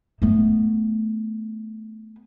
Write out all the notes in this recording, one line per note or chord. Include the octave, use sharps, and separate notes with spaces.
A3 B3